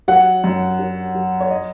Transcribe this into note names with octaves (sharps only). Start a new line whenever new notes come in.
F#3 F#5
F#2
F#3
F#3
C#5
D#5